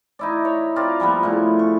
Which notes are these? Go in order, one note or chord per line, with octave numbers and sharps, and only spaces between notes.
D#4 E4 D5
C#5
C4 F4 A#4 D5
F3 G3 A#3 B3
A2 C#3
C#6